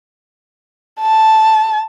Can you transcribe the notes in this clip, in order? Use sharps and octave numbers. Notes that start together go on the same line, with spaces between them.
A5